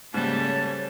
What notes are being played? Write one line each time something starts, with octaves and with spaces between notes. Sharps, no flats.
G#2 C#3 G3 A3 A#3 A5 F#6
C#5